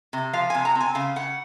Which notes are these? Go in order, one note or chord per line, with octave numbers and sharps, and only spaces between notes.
C3
F3 F5
C3 G#5
A#5
C4
G#5
C#3 F5
C#3 F#5